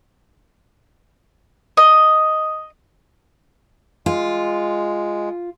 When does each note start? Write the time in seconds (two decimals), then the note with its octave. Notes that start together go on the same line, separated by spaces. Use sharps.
1.77 D#5
4.06 G#3 F4